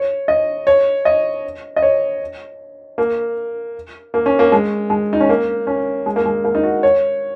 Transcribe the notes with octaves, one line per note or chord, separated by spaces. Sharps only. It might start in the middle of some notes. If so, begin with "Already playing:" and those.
Already playing: C#5
D#5
C#5
D#5
D#5
C#5
A#3
A#3
C#4
A#3
G#3
G#3
D#4
C#4
A#3
C#4
G#3
A#3
G#3
A#3
D#4
F#4
C#5